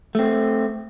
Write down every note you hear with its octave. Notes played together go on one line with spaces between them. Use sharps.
A3 C4